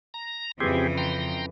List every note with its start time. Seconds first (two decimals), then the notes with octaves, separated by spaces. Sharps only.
0.14 A#5
0.60 F2 C#3 E3 C4 G4 G#4
0.98 G5 A#5 C6